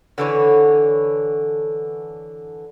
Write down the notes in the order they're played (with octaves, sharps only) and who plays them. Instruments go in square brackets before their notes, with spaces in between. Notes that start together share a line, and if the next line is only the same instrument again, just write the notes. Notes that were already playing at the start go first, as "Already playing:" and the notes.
[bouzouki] D3 E3 C#5